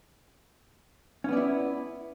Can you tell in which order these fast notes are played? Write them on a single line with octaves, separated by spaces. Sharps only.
C#4 B3 D5 E4